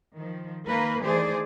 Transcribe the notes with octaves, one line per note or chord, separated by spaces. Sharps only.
D#3 F3
D#3 A#3 A#4 B4
D#3 E3 A3 G#4 C5 D5